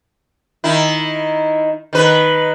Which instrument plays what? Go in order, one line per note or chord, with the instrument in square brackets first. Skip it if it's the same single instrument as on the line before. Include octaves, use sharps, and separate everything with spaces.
[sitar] D#3 E4
D#3 B4